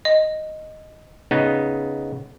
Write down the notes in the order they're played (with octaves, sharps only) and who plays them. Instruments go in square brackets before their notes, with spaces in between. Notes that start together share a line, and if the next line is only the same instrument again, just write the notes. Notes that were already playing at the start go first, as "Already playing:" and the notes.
[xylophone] D#5
[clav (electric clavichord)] C#3 B3 D#4